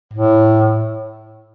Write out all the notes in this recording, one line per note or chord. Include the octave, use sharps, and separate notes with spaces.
A2